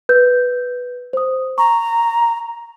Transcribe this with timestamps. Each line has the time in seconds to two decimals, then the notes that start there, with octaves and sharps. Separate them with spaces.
0.09 B4 G6
1.13 C5 D#6
1.58 A#5 C#6